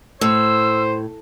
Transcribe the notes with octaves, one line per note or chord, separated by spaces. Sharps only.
A2 C5 E6